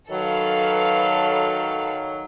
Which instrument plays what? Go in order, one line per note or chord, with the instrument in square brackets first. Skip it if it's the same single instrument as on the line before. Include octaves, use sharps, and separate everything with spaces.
[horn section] D#3 F#3 [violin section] A4 B4 F5